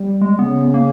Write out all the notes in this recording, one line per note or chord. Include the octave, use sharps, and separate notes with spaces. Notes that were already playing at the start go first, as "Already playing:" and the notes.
Already playing: G3
G#3
C#3 B3
A#3